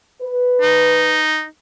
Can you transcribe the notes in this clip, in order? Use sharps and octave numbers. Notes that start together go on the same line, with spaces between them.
B4
D#4